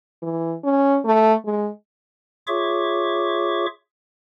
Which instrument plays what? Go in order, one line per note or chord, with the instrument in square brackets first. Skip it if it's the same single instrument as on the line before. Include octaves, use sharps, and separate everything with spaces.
[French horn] E3
C#4
A3
G#3
[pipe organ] F4 G#4 C#5 E5 C#6 D6